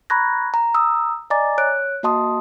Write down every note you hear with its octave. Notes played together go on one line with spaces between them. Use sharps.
A#5 B5 C#6 F#6 G#6 A#6
A#5
A#5 D#6 E6
D5 D#5 G#5 A#5 D6 A6
C#5 F#6 D7
A#3 F#4 D#5 A5 C6 D#6